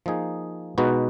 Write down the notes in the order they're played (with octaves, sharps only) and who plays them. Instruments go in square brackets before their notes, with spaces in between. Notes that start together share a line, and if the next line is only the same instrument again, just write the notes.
[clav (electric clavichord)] F3 A#3 D#4 G#4
B2 G#3 D#4 F#4 B4